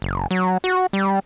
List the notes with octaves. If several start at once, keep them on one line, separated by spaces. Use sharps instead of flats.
F#1
F#3
F#4
G3